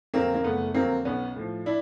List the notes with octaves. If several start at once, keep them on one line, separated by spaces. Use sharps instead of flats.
F2 D3 F#3 A#3 C4
A#3
F#1 A3 B3
F2 D3 F#3 A#3 C4
B1 B3 C#4
A2 F3
D4 E4